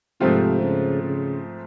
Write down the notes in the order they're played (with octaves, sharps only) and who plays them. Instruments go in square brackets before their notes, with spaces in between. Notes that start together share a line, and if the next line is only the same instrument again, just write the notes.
[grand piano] G#2 F3 A3 C4 F4 [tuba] C3
[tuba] C#3
C#3